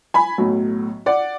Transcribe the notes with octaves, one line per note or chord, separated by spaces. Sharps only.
G#5 B5
B1 A2 F#3
D5 F#5